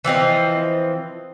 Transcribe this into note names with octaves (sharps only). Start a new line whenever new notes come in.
E3 F3 C4 D#5